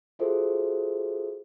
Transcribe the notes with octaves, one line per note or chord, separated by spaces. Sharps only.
F4 F#4 G#4 A4 C5 E5